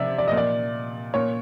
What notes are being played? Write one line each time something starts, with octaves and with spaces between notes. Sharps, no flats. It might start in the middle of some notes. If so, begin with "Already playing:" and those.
Already playing: C3 D5 E5
D5
A#2 D#5
D5
A#2 C#5